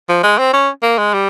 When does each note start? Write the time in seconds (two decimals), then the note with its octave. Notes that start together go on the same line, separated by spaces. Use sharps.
0.09 F3
0.23 G#3
0.38 C4
0.53 C#4
0.83 A#3
0.98 G#3
1.14 G3